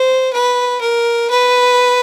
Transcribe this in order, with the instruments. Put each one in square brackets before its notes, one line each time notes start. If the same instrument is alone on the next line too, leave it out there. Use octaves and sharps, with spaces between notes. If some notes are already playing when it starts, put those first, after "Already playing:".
Already playing: [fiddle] C5
B4
A#4
B4